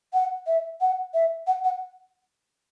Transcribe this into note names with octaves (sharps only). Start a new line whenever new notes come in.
F#5
E5
F#5
E5
F#5
F#5